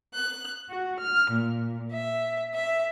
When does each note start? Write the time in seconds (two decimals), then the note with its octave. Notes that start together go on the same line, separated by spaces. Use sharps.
0.13 F#6
0.70 F#4
1.00 F6
1.30 A#2
1.92 E5
2.54 E5